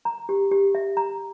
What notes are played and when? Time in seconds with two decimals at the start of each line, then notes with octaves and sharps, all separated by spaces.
0.05 A#5
0.29 G4
0.51 G4
0.75 E5
0.97 A#5